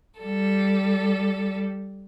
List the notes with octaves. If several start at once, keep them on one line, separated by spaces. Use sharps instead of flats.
G3 A4